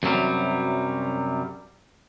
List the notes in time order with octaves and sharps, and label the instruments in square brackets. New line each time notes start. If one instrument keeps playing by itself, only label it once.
[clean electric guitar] F#2 C3 F#3 G3